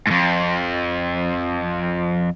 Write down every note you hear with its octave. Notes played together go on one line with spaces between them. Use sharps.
F2 G#2